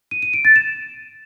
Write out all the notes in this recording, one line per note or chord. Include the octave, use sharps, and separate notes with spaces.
D#7
D#7
D7
A6
E7